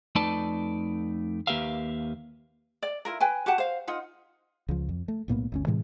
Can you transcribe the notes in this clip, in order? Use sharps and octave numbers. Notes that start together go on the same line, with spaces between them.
F2 A3 D#4 B4 D5 A5
D#2 A#3 G4 B4 E5 F5
D5
E4 F4 A#4
B4 G5 G#5
F#4 G4 F#5 A5
C5 F5
D#4 F4 F#5
C#2 F3
F2
A3
B1 A2 A#3 B3
G1 D2 C#4
A2 C3 E3 G#3